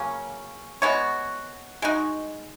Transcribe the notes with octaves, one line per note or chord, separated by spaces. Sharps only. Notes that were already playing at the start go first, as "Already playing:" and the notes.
Already playing: C#3 F#3 A#3 C#4
G#3 B3 F#4 C#5
G#3 D#4 F#4